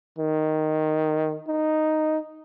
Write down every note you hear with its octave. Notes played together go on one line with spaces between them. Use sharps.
D#3
D#4